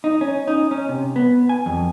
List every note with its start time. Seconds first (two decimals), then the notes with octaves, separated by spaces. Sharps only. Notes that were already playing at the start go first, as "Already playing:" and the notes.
0.04 D#4
0.21 C#4
0.48 D#4
0.71 C#4
0.89 C3
1.16 B3
1.49 G#5
1.66 F2